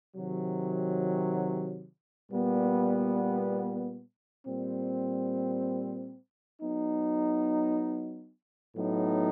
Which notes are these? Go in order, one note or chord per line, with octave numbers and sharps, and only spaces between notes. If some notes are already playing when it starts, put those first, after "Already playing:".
C3 D#3 F#3
A#2 G3 B3
A#2 G3 C4
F#3 B3 D#4
A2 F#3 B3 D#4